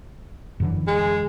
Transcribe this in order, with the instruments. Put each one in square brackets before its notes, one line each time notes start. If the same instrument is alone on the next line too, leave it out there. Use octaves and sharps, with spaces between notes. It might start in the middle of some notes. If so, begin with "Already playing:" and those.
[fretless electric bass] F#2 D3 E3
[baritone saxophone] G#3